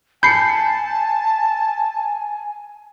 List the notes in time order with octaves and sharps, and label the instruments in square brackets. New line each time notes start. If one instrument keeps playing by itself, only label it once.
[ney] G#5 [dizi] A5 [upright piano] B5 C#7 [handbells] G6 C7